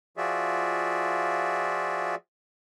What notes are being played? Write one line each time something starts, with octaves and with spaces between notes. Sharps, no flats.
F3 F4 F#4 G#4 D5 E5